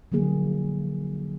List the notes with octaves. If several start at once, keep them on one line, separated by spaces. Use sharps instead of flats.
D3 F3 F#3 A#3 G#4